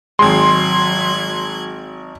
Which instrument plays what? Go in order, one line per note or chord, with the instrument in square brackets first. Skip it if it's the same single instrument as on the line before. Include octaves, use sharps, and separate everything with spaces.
[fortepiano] G#1 G#3 [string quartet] F#3 F#6 G#6 [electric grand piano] C6